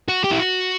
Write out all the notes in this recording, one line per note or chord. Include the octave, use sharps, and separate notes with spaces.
F#4
G4
E4
F#4